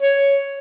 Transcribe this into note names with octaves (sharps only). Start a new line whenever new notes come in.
C#5